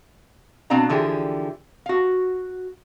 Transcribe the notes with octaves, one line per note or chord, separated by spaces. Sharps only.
B2 C4 D4 F5 A#5
D3 E3 F3 G4 G#4
F#4 F5